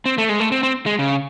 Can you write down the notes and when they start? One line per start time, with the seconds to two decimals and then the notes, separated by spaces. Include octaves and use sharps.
0.06 C4
0.18 A3
0.29 G#3
0.40 A3
0.52 C4
0.63 C4
0.86 G#3
0.99 C#3